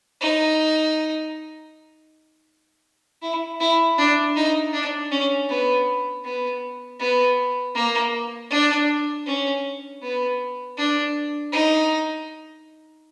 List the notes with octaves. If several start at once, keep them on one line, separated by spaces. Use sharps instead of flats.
D#4
E4
E4
D4
D#4
D4
C#4
B3
B3
B3
A#3
D4
C#4
B3
D4
D#4